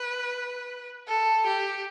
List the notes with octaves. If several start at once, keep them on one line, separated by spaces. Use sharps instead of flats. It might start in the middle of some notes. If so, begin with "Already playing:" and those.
Already playing: B4
A4
G4